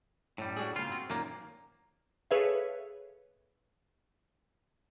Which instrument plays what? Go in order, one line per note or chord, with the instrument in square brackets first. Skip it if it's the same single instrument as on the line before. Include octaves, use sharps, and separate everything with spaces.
[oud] F#2 [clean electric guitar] A2 G3
[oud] D4 F#4 G#4
[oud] C#3 A#3 [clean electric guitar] F4
[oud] C4 F#4
[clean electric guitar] F#2 A#2 A#3 [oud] D#3 A#4
[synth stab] G#4 A4 B4 C#5 E5 F5